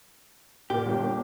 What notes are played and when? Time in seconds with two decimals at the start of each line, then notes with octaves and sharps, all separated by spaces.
0.70 A#2 A#3 G4
0.86 G1